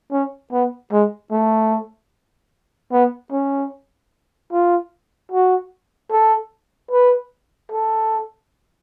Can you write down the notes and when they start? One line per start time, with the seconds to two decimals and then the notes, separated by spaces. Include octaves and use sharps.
0.12 C#4
0.52 B3
0.92 G#3
1.32 A3
2.92 B3
3.32 C#4
4.52 F4
5.32 F#4
6.12 A4
6.91 B4
7.72 A4